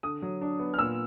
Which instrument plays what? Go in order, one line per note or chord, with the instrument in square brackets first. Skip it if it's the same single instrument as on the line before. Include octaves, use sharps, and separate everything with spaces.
[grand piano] D3 D#6
F#3
D4
B3
F6
A#2 E6